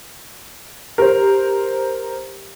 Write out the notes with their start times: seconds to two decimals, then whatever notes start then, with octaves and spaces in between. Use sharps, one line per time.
0.98 G4 A#4 C5